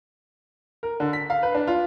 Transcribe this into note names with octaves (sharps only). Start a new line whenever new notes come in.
A#4
D3
B6
F5
B4
D4
F4